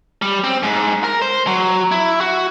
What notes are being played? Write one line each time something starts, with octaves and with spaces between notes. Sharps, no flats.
G3
C4
G#2
A#4
C5
F#3
E4
F#4